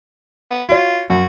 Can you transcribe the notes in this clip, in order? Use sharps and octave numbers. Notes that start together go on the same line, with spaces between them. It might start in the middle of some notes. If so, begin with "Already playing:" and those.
B3
F4 F#4 C#5
F#2 F#4